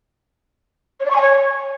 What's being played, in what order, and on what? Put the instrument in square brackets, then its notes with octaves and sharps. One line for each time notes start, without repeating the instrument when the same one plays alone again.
[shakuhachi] C#5
D5
C#6
G#5
C#5